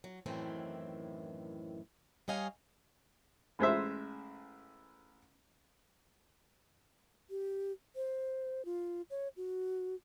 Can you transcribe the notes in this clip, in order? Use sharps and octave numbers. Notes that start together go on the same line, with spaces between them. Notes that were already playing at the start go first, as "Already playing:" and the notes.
F#3
F#2 A2 D#3 E3 C4 E4
G3 G#4 C#5 D#5 F5 G#5
A1 G#3 C5 E5
G4
C5
F4
C#5
F#4